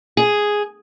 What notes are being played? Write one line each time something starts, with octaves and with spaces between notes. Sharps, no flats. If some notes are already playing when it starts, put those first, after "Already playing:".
G#4